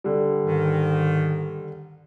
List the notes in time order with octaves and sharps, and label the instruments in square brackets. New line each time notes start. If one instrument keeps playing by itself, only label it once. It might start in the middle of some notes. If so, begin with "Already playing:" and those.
[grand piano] D3 G3
[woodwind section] G#2 D#3